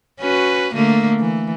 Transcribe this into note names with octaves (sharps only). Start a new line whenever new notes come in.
C#4 F#4 B4
D3 A3 A#3
E3